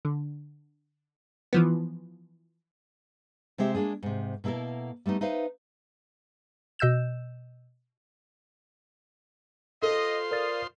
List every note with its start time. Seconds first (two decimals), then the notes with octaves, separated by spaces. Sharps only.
0.05 D3
1.53 E3 F3 B3
3.58 C3 G#3 C4 G4 E5
3.75 G#3 A#3 D4 G#4
4.03 G#2 C3
4.44 B2 A#3 E4 A4 A#4
5.06 G3 A3 B3 D#4
5.21 D#4 B4 C5 E5 F5
6.79 B2 D#5 E6 G6 E7
9.82 F4 A4 C5 D#5 C6
10.31 A#4 D5 F5 D#6 A6